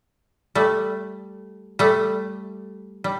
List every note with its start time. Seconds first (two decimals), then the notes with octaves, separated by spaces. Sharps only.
0.55 G3 A3
1.79 G3 A3
3.04 G3